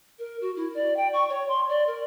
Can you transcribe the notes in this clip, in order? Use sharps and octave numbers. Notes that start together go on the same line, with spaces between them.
A#4
F#4
E4
D5
G5
C#6
C#5
C6
D5
A#4